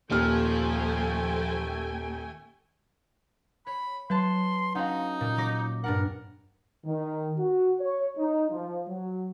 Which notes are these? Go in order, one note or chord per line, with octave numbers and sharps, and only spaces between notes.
D#1 D#2 F3 A3 G5 G#5 F6
C#5 B5
F#3 B4 C#5 A5 C6
C#4 D#4 F#4 F5 F#5
A#2
F#3 D6 A#6
G2 D4 A#4 F#5
D#3
F#4
C#5
D#4
F3
F#3